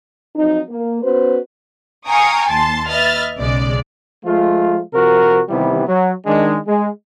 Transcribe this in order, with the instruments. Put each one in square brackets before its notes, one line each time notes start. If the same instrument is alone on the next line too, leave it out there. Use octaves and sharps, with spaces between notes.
[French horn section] F3 F#3 C4 D#4
A#3
B3 C#4 F#4 B4 C5
[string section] F5 G5 G#5 A#5 C#6 D#6
D#2 A5 C6 A6
B4 D#5 E5 F6 A6
B1 C#3 G#3 D5
[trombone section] F3 G#3 A3 F4
C3 F3 F#4 A#4
C3 D#3 E3 G3 B3 E4
F#3
D#3 G#3 D4
G#3